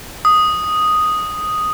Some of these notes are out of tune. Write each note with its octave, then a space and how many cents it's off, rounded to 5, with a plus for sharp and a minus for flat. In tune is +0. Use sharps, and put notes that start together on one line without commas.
D#6 +0